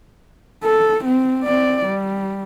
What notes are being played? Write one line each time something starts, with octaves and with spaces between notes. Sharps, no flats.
A4
C4
C4 D5
G3